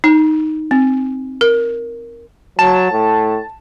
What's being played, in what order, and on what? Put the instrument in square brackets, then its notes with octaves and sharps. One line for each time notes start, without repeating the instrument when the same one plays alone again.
[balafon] D#4
C4
A#4
[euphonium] F#3 [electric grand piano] A5 E7
[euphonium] A2